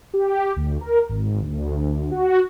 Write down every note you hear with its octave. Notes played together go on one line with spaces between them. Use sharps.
G4
D2
A#4
G#1
D2
F#4